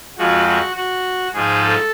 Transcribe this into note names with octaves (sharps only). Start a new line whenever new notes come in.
F2 F3 G#3 F#4
F#4
F#4
G#2 F3 G#3 G#4
A4